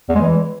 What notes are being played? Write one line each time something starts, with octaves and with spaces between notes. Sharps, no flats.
E2
G#3
E3